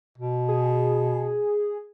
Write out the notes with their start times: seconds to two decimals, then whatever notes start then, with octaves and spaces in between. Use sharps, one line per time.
0.18 B2
0.49 G#4